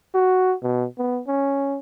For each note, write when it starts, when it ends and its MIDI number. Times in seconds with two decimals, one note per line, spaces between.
0.14 0.54 66
0.63 0.85 47
0.98 1.20 59
1.27 1.78 61